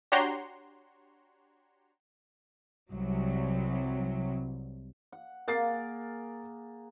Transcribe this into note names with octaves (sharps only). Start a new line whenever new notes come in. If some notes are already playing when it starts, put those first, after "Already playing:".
D4 F#4 G4 C#5 A#5 C6
C2 F#3
F#5
A#3 G#4 A#4 A6 C7